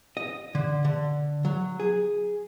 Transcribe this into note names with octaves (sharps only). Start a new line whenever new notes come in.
D#5
D3
D3
F#3
G#4